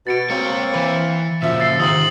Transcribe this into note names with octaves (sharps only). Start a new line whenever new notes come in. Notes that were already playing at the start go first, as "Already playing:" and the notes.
B2 A6 C#7 D7
G#3 A#3 C4 C#5 C#7
E3 B4
F#2 A#2 C#3 F3 E5
E6 A6 C7
G#2 C3 D#3 D#6 F#7